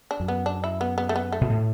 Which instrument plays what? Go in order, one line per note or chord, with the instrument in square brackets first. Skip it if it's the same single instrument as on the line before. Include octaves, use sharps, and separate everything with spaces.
[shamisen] D4
[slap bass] F#2
[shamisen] B3
D4
E4
B3
B3
A3
B3
A3
[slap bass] B2
A2